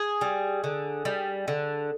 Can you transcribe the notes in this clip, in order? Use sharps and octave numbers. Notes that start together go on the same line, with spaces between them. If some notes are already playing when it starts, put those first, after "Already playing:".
Already playing: G#4
G3
D3
G3
D3